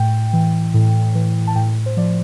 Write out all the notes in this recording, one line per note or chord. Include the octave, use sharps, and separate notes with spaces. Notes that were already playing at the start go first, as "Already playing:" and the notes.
Already playing: A2 G5
E3
A2
E3
A5
A2 G5
C5
F3 D5